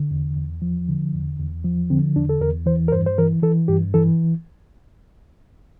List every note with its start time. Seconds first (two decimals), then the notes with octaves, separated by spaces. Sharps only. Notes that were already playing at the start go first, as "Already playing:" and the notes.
Already playing: D3
0.11 E2
0.37 E2
0.62 F3
0.88 D3
1.14 E2
1.39 E2
1.64 F3
1.90 D3 C4
2.16 E2 D4
2.29 A4
2.41 E2 A#4
2.66 E3 C5
2.88 A#4
2.92 G2 C5
3.06 C5
3.18 E3 A#4
3.43 E3 A4
3.68 G2 G4
3.94 E3 A4